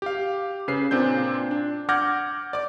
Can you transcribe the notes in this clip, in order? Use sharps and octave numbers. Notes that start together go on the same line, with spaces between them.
G4 F5
C#3 B4 C7
A#2 C4 D4 G6
D4
F#5 D6 F6 G6 G#6 A#6
D5 D6